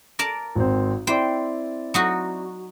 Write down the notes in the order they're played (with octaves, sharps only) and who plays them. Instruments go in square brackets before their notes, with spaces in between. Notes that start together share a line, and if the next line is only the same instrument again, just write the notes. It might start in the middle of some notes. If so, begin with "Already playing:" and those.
[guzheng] A#4 D5 A5
[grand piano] G#1 C4
[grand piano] C4 E4 D5 [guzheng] C5 G5
[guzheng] F#3 D#4 F#4